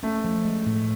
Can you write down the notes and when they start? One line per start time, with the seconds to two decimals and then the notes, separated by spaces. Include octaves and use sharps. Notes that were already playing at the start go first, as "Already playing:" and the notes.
0.03 A3 C#4
0.24 F3
0.45 G#3
0.66 A2